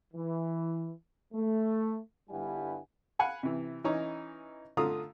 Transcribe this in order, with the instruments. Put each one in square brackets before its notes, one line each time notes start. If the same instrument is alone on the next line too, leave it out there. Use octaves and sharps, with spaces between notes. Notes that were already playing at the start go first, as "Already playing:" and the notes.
[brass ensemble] E3
A3
G1 G2 G3 E4 F#5 G#5
[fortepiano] F5 F#5 G#5 B5
C3 E3
E3 C#4 D#4 C#5 A#5
D3 A3 F4 F5 A#5 D#6